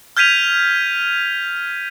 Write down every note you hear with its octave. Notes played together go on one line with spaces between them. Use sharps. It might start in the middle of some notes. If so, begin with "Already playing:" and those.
F6 G6 G#6 B6 D#7 F7